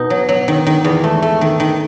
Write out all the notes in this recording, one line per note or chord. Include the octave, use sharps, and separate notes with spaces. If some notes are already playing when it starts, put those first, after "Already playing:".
Already playing: B2 D#4
F#3
F#3
D#3
D#3
E2
A3
A3
D#3
D#3